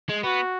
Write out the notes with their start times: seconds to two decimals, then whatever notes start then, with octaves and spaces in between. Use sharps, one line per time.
0.09 G#3
0.23 B3 F#4